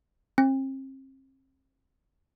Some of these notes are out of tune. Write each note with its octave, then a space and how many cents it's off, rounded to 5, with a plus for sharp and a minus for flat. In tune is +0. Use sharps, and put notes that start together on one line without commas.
C4 +40